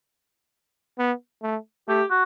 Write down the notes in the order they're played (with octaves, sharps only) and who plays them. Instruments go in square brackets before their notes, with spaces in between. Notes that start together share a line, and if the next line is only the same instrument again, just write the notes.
[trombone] B3
A3
[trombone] A3 [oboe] G4
[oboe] F#4